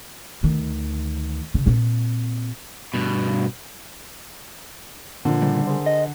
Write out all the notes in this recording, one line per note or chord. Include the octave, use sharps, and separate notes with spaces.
D2 D#3
C#3
A#2 C4
G2 B2
A#2 D3 F3
C#3 G3
G#4 A#4 C5
D#5